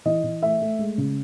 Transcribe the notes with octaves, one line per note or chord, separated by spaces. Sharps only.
E3 D#5
E3
A3 E5
A3
G#3
C#3